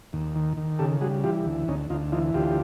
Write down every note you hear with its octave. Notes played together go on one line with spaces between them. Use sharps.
D#2
D#3
D#3
C#3 G4 A4
G3 F#4 G#4
E3 F4 G4
D2
D2 C#4 D#4
D2 D#4 F4
E3 D#4 F4
D2 F4 G4